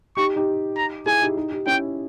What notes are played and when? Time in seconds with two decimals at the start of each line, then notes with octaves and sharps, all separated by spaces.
0.17 D#4 G4 C#6
0.36 D#4 G4
0.77 A#5
1.06 E4 G#4 G#5
1.22 D#4 G4
1.37 D#4 G4
1.52 D#4 G4
1.66 C#4 E4 G5